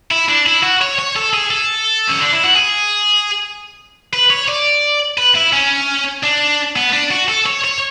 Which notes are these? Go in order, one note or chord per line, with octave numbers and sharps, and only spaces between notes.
E4
D4
E4
F#4
C#5
C#5
A4
G#4
A4
C#4
D4
E4
F#4
G#4
B4
C#5
D5
B4
E4
C#4
D4
B3
D4
F#4
A4
C#5
C#5